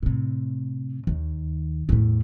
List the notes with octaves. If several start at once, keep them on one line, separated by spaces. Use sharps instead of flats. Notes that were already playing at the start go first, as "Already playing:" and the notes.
A2 C3
D#2 D#3
E2 A2